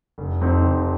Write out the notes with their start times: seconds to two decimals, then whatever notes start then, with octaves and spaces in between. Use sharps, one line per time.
0.18 F1
0.41 F2 F3 C4 D#4
0.63 F1